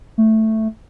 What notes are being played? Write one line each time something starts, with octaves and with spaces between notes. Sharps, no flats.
A3